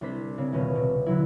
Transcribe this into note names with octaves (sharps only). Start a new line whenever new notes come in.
C2 D4 C5 B6
C#3 C4
D#1 B2 C#4
C3
B2 D3 F#3 E4